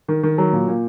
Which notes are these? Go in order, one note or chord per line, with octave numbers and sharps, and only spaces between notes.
D#3
D#3
F#3
A#2
A#2